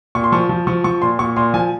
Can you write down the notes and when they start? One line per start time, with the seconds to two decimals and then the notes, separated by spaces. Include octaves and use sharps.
0.15 A#2 C#6
0.24 C6
0.32 F3 C#6
0.49 F3
0.67 F3 C#6
0.84 F3 C#6
1.02 A#2 C6
1.19 A#2 C#6
1.36 A#2 C6
1.54 F3 G#5